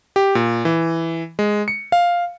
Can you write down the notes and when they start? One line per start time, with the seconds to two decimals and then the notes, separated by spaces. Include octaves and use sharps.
0.16 G4
0.35 A#2
0.65 E3
1.39 G#3
1.68 C#7
1.92 F5